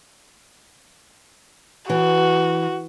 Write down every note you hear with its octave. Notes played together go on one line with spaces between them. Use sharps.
E3 F#4